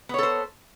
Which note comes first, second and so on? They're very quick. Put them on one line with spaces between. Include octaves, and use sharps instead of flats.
B3 C#5 A4 C5